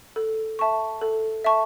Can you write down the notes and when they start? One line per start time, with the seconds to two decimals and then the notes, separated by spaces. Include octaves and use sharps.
0.16 A4
0.59 E5 A5 C#6
1.01 A4
1.44 E5 A5 C#6